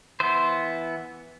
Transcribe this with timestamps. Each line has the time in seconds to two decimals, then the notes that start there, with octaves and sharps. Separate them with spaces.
0.20 E3 B3 C5